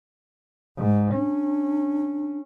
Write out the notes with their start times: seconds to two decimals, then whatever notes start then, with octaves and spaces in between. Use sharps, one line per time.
0.77 G#2
1.14 C#4 D4